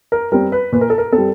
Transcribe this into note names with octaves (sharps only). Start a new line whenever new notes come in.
A#4
G3 C4 A#4
B4
A#2 B4
A#4
A4
A#4
C4 A4
G3